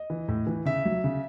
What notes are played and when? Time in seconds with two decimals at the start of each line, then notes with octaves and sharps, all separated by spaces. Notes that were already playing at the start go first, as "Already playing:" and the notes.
Already playing: D#5
0.10 E3
0.28 A2
0.47 E3
0.65 C#3 E5
0.85 F#3
1.04 C#3